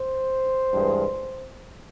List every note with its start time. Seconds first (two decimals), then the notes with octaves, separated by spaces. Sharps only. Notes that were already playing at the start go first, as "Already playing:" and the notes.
Already playing: C5
0.72 G2 E3 G#3